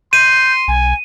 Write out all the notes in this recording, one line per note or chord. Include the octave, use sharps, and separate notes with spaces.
C6 G6 D#7
B1 G#5